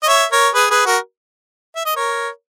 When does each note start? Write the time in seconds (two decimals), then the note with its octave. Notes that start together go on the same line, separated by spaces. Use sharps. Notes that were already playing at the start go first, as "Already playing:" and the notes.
0.03 D#5
0.07 C#5 E5
0.32 A#4 C#5
0.54 G#4 B4
0.71 G#4 B4
0.86 F#4 A#4
1.76 E5
1.85 D#5
1.95 A#4 C#5